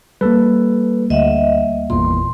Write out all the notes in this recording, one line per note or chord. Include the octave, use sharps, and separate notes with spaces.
G3 A#3 A4 B4
D2 D#5 E5 F#5
G#1 E2 A#2 C6